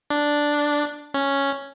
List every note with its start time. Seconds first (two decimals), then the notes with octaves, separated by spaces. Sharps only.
0.10 D4
1.14 C#4